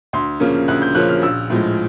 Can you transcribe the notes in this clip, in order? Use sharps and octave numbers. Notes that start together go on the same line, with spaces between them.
D2 C6
C#3 F3 A#3 C#4
D2 F#6
G6
C#3 F3 A#3 C#4 F#6
F6
A#1 E6
A2 F3 G#3